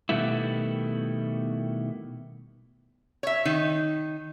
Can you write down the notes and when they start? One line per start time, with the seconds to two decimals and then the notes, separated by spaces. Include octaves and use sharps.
0.09 B2 D#3 G3 A3 B3 E4
3.23 C#5 E5
3.45 D#3 D#4